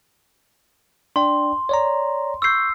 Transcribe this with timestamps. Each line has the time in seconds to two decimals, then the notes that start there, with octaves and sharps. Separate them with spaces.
1.16 D4 D5 G5 C6
1.69 C#5 D5 A#5
2.42 C#6 E6 G6 C7